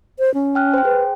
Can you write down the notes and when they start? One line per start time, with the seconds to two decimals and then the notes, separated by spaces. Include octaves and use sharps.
0.19 C5
0.34 C#4
0.55 G5 F6 F#6
0.74 C5 G5
0.85 G#4 B4